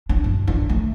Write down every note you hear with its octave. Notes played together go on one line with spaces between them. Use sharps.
D4
F#2
D4
A3